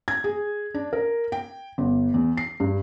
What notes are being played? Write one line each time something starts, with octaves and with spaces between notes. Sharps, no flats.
G#6
G#4
D4
A#4
G5
G1
E2
C7
G2